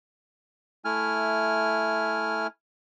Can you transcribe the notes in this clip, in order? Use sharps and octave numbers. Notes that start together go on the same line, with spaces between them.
A3 E4 G#5 F6